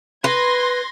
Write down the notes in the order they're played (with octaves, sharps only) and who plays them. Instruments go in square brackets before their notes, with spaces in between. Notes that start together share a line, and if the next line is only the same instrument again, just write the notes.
[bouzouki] B4 [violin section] C6 G#6 A#6